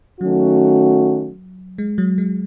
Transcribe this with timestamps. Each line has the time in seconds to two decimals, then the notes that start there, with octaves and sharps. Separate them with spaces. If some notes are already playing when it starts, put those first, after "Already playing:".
0.21 D#3 F#3 A3 C#4 F#4
1.78 G#3
1.98 F#3
2.18 G#3